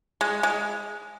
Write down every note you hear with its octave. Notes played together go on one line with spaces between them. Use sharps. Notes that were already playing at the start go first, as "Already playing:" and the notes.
G#3
G#3